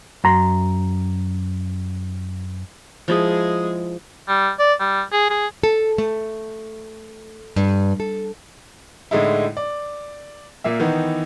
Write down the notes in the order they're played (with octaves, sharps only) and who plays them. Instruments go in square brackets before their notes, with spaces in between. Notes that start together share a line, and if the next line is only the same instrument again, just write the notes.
[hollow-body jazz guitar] F#2 A#5 C6
[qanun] F3 E4 D#5 [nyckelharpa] G#3 G#4
[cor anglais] G3
D5
G3
G#4
G#4
[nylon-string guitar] A4
A3
G2
A4
[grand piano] A2 D3 G#3 D#4 E4
D5
A#2 A#3 E5
D#3 E3 B3 D#4